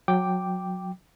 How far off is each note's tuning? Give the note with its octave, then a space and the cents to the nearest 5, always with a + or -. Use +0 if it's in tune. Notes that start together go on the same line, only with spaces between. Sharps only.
F#3 -20 G5 +0 D6 +0